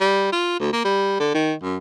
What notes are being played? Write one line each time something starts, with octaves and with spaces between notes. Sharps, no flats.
G3
F4
D2
A#3
G3
D3
D#3
F#2